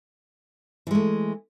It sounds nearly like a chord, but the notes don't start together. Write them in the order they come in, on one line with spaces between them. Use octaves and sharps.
E3 G#3 A3